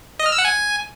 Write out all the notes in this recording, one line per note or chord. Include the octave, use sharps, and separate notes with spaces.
D#5
F6
E6
F#5
G#5